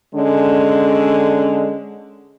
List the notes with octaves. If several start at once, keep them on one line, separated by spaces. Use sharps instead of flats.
D3 G#3 C#4